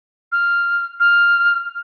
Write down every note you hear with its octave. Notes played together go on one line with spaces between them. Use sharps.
F6
F6